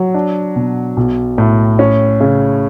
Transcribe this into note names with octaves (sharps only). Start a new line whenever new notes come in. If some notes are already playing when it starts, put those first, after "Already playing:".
Already playing: F#3
D4
B2
B1
A2
C#4
C#3